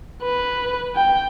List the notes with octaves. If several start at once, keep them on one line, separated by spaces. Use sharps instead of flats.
B4
G5